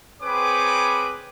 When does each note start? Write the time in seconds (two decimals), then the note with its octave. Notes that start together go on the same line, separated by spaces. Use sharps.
0.22 C4 G#4 B4 C#5 B5 D6